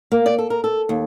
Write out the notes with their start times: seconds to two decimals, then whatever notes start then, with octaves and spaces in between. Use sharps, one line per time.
0.12 A#3
0.26 D5
0.38 A4
0.50 A#4
0.64 A4
0.89 D#2